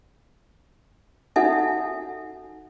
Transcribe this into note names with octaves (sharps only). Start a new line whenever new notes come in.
D#4 F#4 A4 E5 F#5 G#5